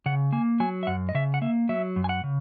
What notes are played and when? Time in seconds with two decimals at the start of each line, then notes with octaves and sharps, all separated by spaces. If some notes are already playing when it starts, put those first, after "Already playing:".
0.06 C#3 F#5
0.32 A#3 G#5
0.60 F#3 G#5
0.83 E5
0.87 F#2 F#5
1.09 D#5
1.15 C#3 E5
1.34 F#5
1.42 A#3 E5
1.69 F#3 E5
1.96 F#2
2.04 G#5
2.09 F#5
2.24 C#3